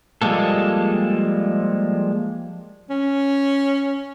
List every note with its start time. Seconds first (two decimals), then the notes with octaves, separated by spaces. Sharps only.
0.22 F3 G3 G#3 A#3 A4
2.90 C#4